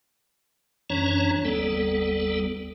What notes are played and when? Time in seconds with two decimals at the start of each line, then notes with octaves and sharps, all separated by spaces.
0.90 F#2 E3 C#4 D4 C#5 A#5
1.45 G1 D#2 G3 B3 A4